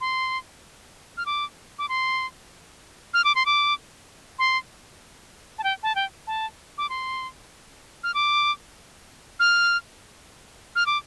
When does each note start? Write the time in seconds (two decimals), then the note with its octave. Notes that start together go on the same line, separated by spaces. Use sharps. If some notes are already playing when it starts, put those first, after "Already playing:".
0.01 C6
1.17 F6
1.26 D6
1.79 D6
1.89 C6
3.14 F6
3.24 D6
3.35 C6
3.46 D6
4.39 C6
5.58 A5
5.64 G5
5.83 A5
5.95 G5
6.27 A5
6.78 D6
6.89 C6
8.04 F6
8.14 D6
9.40 F6
10.76 F6
10.86 D6